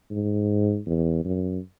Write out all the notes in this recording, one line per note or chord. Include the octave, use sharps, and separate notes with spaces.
G#2
E2
F#2